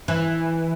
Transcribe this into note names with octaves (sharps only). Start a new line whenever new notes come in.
E3